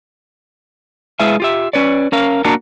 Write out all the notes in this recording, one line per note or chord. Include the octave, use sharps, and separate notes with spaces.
G#3 E4 G#4 B4 E5 F5
F4 G4 E5
C#4 B4 C#5 D5
C#4 A#4 F5
A#3 D4 F#4 A#4 A5 A#5